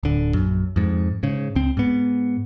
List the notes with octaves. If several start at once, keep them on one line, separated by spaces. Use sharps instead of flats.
D1 D3
A#1 F#2
F2 G#2
G#2 C#3
C#2 C4
G#2 B3